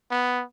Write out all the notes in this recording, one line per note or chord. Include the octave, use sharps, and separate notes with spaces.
B3